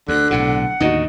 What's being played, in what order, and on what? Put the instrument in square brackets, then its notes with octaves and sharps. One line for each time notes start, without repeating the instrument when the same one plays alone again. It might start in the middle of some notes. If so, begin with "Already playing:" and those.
[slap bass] D2 [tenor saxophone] D3 [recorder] F#6
[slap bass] B1 A2 C3 [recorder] F#5
[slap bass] D#2 A2 D3 [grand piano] D#4 F#4